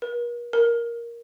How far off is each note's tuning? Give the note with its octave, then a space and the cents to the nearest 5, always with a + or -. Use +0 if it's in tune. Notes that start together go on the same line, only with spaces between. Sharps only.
A#4 +45
A#4 +10